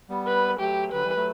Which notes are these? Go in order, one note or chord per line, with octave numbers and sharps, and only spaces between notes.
G3 B3
B4
F#3 A3 G4
D3 F#3 B4
E3 G3
F#3 A3